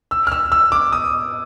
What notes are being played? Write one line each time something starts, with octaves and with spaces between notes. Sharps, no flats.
E6
F6
E6
E6
D6
D#6